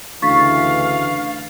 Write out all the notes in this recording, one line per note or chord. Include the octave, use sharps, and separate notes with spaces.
D2 C#3 E3 F5 C#6 A6 B6